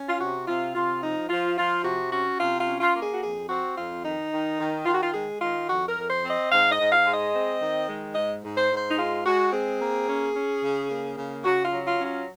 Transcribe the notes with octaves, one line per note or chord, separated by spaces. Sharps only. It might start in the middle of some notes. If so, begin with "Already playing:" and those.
Already playing: C#4
F4
C3 F#4
C3 F4
C3 F4
F3 D#4
F3 F4
F3 F4
C3 F#4
C#4 F#4
C3 F4
F4
C#4
F4
A#3
G#4
F#4
F2 G#4
C4 F#4
F2 F4
D#3 D#4
D#3
D#3
D#3 F4
F#4
F4
G#3 G#4
D#3 F4
F2 F#4
A#4
F2
C5
C4
D#5
G#2 F5
D#5
G#2
F5
G#3
D#5
C4
D#3
G#3
G#2 D#5
G#2
C5
G#2
C5
D#4
G#3 F4
G#3 F#4
C4 G#4
A#3
C#4
C#4
C#3
A#3
C#3
C#3 F#4
F4
F#3
F4
C#4
F4